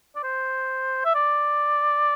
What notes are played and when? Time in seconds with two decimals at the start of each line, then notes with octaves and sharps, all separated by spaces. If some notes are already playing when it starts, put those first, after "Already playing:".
0.16 D5
0.23 C5
1.05 E5
1.15 D5